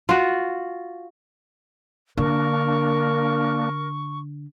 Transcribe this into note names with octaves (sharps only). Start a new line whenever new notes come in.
F4 F#4
D3 A#3 D4 A#4 C#6